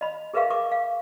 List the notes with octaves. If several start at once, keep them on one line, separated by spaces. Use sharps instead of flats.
D#5 B5
G#4 A#4 B4 E5 F5 C#6
B4 C#6 D6
F5